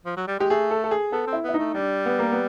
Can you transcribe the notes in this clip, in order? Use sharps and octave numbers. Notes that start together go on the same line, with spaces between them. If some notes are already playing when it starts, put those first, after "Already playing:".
F3
F#3
G3
G#3 G4
A3 G#4
A4
A4
G#4
B3 A4
C4
E4
B3 E4
A3 D#4
G3 D4
B3
A#3
B3